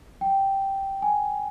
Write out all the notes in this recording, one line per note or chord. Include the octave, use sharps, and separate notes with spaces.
G5
G#5